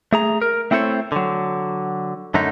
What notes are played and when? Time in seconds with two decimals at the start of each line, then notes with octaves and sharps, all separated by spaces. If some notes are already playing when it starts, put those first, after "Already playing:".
0.13 A3 G#4 A#5
0.42 A#4
0.71 A3 C4 E4 A4 C5 C#5
1.12 D3 F#3
2.34 F#2 D3 A3 D#4